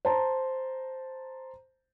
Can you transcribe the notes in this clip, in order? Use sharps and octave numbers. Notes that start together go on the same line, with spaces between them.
C5 A5 A#5